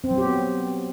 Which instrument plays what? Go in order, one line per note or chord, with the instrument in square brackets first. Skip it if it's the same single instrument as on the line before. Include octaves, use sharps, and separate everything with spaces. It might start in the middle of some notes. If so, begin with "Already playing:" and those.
[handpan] C4
F#3
G4
B3